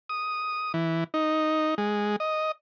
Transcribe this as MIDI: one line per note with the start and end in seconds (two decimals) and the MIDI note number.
0.09 0.72 87
0.74 1.04 52
1.14 1.75 63
1.78 2.16 56
2.20 2.51 75